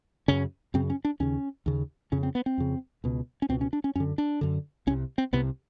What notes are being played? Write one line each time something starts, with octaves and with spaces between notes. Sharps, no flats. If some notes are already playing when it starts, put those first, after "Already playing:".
F#2 C#3 C#4
F#2 C#3 C4
C#4
D4
D#2 C#3 C#4
D#2 C#3
F2 C#3 C#4
C4
B3
C4
F2 C#3
C#2 B2
C#4
C#2 B2 C4
C#4
D4
C#4
F#2 D3 C#4
D4
F#2 D3
C2 C3 C#4
C4
C2 C3 B3